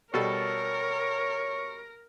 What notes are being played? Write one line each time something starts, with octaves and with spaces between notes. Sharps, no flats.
B2 G3 A4 A#4 C#5 C#6